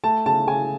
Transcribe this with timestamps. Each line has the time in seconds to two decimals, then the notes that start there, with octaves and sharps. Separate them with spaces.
0.04 A3 A5
0.26 C#3 A5
0.47 C#3 G#5